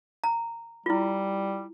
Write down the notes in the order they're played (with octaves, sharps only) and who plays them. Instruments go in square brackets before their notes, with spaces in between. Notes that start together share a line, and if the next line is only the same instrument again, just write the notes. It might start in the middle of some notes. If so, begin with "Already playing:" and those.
[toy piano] A#5
[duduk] G3 [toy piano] E4 F4